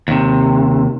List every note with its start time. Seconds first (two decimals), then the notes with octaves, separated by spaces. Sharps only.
0.08 D#2 C3